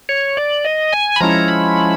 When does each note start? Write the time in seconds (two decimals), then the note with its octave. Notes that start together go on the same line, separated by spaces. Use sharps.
0.09 C#5
0.37 D5
0.65 D#5
0.93 G#5
1.16 B5
1.20 F3 G#3 C#4 E4 A#5
1.48 B5